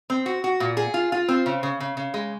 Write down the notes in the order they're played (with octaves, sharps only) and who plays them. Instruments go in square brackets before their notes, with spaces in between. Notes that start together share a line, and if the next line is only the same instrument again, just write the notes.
[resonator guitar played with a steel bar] C4
F#4
F#4
A#2
G#4
F4
F4
C4
C#3
C#3
C#3
C#3
G#3